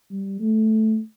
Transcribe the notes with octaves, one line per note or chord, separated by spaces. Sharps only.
G3
A3